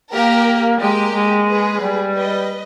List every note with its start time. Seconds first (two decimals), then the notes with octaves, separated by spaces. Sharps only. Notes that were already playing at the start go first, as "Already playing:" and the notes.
0.14 A#3 G4 A#4
0.81 G#3 G4 A#4
1.15 G#3
1.48 G#4 B4
1.82 G3
2.15 B4 D#5